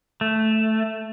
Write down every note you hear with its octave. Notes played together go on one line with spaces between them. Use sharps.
A3